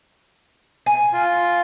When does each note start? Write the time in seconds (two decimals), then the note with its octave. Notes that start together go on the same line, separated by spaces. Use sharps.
0.86 G#5
1.13 F4